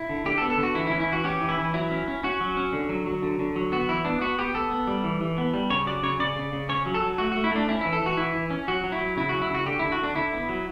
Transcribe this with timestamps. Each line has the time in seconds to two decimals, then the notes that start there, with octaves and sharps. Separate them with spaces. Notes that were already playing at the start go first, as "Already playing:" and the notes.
Already playing: E4
0.09 D3
0.26 D3 G4
0.38 A4
0.42 B3
0.50 A4
0.58 D3
0.63 F#4
0.75 E3 E4
0.87 C#4 E4
1.00 E4
1.08 E3 F#4
1.24 C#4 G4
1.41 E3
1.49 E4
1.58 E3
1.74 F#3 E4
1.91 C#4
2.08 C#4
2.23 C#4 F#4
2.41 F#3
2.57 C#4
2.73 D3
2.89 F#3
3.06 F#3
3.22 D3
3.39 D3
3.56 F#3
3.72 B3 F#4
3.89 E3 E4
4.05 B3 D4
4.21 B3 F#4
4.38 B3 G4
4.54 B3 A4
4.71 B3
4.87 G3
5.04 E3
5.21 E3
5.38 B3
5.54 G3
5.70 C#3 C#5
5.86 F#3 D5
6.03 C#3 C#5
6.19 C#3 D5
6.36 C#3
6.53 C#3
6.69 C#4 C#5
6.86 F#3
6.94 A4
7.02 F#3
7.18 A3 F#4
7.32 A3 F#4
7.44 E4
7.51 A3 D4
7.68 C#4 E4
7.81 E3 E4
7.93 A4
8.02 E3 F#4
8.17 E3 E4
8.35 E3
8.50 C#4
8.68 F#3 F#4
8.84 F#3
8.92 E4
9.01 F#3
9.17 C#3 E4
9.29 F#3 F#4
9.42 E4
9.50 C#3 F#4
9.66 D3 G4
9.79 D3 E4
9.92 F#4
9.99 D3 D4
10.16 D3 E4
10.33 B3
10.49 F#3